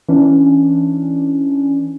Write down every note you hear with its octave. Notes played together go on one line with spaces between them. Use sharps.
E3 C#4 D4